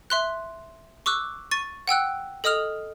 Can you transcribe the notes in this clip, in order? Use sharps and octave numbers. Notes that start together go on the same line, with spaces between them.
E5 C6 F#6
C#6 D6 E6 F#6
C#6 A6 D#7
F#5 G5 E6 F#6
A4 D#5 D#6 F6 F7